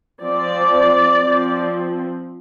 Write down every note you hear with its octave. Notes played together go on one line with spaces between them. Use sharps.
F3 C4 D5
F3 C4